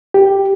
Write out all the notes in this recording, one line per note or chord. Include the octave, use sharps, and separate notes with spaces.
G4